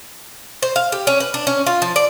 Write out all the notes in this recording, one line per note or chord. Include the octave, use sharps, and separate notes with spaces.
C5
F5
G4
C#4
B4
D4
C#4
F4
F3
D5